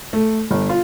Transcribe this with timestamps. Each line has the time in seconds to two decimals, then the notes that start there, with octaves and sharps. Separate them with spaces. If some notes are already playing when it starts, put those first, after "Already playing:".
0.13 A3
0.51 G1
0.69 F4